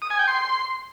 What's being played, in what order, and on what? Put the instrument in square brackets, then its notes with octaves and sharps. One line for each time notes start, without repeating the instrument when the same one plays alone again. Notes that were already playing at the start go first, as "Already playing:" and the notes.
[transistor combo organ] D#6
G#5
G5
C6